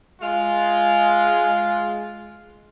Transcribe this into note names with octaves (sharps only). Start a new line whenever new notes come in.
G#3 F4